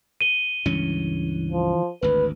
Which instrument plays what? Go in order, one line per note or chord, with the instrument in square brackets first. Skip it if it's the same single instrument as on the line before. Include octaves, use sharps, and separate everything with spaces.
[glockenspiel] D#7 G7
[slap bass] C#2 G2 C#4 [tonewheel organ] E3
[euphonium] F3
[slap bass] G#1 D2 [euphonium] B4